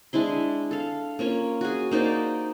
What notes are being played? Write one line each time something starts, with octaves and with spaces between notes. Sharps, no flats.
G#3 D4 E4 C6
A4 F5
A#3 C#4 F4 C#5
F#4 G#4
A#3 D#4 C5 D5